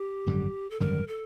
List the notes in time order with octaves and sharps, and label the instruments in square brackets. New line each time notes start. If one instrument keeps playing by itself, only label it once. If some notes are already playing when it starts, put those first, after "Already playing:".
Already playing: [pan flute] G4
[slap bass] G#1 F#2 D3 G3
[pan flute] A4
[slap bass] G#1 F#2 D3 G3 [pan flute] A#4
[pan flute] A4